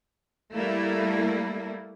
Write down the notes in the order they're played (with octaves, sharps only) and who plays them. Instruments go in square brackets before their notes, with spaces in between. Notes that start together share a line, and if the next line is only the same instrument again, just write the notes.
[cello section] G3 A3 A#3 E4